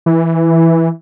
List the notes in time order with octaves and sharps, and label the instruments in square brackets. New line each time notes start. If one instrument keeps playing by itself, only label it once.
[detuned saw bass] E3